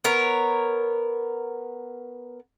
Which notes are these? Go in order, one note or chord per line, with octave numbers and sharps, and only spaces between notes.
B3 A#4 C#5